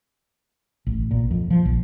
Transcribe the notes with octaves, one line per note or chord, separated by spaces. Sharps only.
A1
A#2
F2
F3
A#1